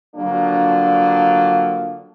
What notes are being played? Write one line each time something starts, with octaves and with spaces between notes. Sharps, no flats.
D3 F3 F#3 A#3 D4